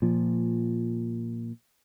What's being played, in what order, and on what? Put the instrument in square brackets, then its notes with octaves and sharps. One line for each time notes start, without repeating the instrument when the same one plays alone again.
[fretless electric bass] A#2 F3